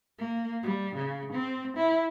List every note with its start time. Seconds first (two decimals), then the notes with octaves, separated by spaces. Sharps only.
0.18 A#3
0.62 G3
0.95 C#3
1.32 C4
1.76 E4